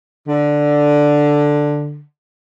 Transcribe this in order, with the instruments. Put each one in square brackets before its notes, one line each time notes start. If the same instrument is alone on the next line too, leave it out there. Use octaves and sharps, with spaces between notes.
[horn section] D3